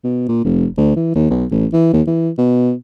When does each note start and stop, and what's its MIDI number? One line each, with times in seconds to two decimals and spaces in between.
0.04 0.27 47
0.28 0.44 46
0.44 0.66 29
0.77 0.93 38
0.96 1.15 52
1.15 1.29 39
1.30 1.45 35
1.51 1.66 33
1.73 1.88 52
1.93 2.02 39
2.07 2.30 52
2.38 2.73 47